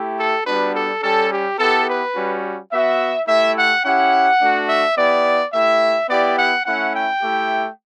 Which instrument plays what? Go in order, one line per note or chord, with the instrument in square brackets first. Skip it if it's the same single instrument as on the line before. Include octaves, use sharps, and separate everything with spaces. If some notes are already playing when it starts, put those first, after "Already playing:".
Already playing: [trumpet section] A3 E4 G4
A4
G3 B3 D4 F#4 B4
A4
G3 C#4 G4 A4
G4
B3 E4 G4 A4
B4
G3 C#4 F#4
B3 F#4 E5
A3 E4 G4 E5
F#5
C#4 E4 G4 F#5
A3 D4 F#4
E5
B3 E4 G4 D5
A3 E4 G4 E5
B3 E4 G4 D5
F#5
A3 C#4 E4 F#5
G5
A3 E4 G4